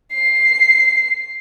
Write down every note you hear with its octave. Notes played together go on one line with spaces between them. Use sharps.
C7